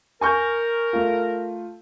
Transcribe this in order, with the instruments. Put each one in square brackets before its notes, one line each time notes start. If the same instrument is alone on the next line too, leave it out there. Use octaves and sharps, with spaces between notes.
[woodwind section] A#4 [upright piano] G#5 C#6 G6
[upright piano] A3 F4